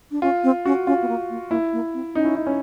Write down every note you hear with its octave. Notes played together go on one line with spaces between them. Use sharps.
D4
C#4 F4
C4
C#4 F#4
C#4 F4
B3
A#3
A#3
A#3 E4
A#3
C4
C#4 D#4
E4
D#4
C#4